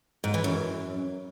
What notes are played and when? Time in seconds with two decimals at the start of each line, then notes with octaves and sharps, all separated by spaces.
0.24 G#2
0.34 E3
0.44 F#2